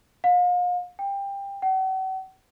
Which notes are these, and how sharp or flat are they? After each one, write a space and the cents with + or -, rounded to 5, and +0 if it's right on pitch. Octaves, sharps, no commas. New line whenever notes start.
F5 +40
G5 +20
F#5 +45